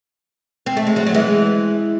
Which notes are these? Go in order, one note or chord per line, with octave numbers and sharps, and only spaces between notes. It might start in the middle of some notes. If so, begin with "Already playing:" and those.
C4
A3
G#3
F#3 A3
F#3
E3 G#3